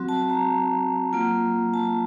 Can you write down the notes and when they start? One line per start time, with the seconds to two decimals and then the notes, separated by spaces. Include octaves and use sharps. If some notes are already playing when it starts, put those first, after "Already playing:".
Already playing: F#3 C4 F#4
0.09 A5
0.30 A#5
1.13 F#3 A#3 F4
1.74 A5